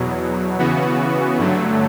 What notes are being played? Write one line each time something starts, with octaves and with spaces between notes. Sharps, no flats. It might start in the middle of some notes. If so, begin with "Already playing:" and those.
Already playing: E2 B2 F#3
C#3 E3 B3 F#4
G2 D3 F#3 A3